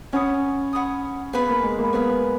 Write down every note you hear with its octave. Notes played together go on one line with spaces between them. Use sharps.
C#4 C#5 F#5 B5 D#6
C#5 F#5 B5 D#6
B3 G#4 B4 F5 B5
A#3
G#3
A#3
B3 G#4 B4 F5 B5